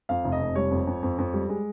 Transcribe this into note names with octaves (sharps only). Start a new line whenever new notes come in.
F2 F5
F1
D#5
F1
G3 C#5
F2
F2
F2
F2
G3
G#3